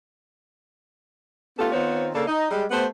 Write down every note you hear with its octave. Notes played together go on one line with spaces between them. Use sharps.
A3 B3 C#4 F4 G4 A4
D#3 B3 C4 F4 C5 C#5
C#3 A#3 D4 A4
D#4 D#5
G3 G#3
A3 B3 G4 C5